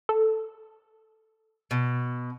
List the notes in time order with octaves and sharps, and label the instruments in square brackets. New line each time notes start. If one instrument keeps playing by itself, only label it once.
[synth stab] A4
[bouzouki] B2